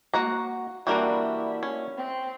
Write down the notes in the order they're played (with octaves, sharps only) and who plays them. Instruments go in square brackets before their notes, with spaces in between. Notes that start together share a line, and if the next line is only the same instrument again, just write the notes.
[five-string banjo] A#3 F#5 A#5 [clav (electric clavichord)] F#4
[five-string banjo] E3 G3 A#4 [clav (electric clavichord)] A#3 D4 F#4 [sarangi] E4
[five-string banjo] C#4
[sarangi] C4